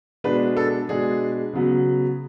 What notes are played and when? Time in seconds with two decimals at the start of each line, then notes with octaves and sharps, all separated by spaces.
0.24 B2 G#3 B3 D4 B4
0.57 A4
0.89 B2 G#3 B3 D4 G#4
1.53 C#3 F#3 B3